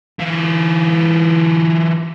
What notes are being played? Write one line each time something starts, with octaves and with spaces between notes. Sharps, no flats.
E3 F4